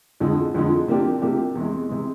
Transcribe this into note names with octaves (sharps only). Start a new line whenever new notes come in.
F2 D3 F3 G#3
F2 D3 F3 G#3
C3 F3 A#3 D4 G4
C3 F3 A#3 D4 G4
E2 C3 E3 G#3
C3 E3 G#3